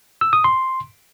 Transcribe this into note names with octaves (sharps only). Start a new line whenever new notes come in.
E6
D#6
C6